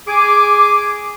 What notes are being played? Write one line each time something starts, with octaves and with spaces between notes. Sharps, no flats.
G#4 G#5 D6